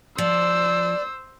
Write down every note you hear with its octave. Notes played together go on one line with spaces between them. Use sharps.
F3 C5 D5 E6